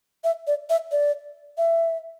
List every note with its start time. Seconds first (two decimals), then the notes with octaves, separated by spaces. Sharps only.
0.24 E5
0.47 D5
0.70 E5
0.92 D5
1.58 E5